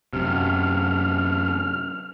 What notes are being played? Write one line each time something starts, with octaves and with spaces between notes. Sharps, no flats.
F#2 C3 F6